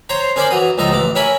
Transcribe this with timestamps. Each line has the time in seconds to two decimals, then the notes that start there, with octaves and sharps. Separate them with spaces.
0.09 C5 C#5 A#5 C6
0.36 C#4 G#4 A#4 C5 D5 B5
0.51 E3 F#3 D#6
0.78 C#2 F3 A4 D#5 A#5
0.92 A1 E3 D6
1.15 C#4 E4 A#4 G#5 B5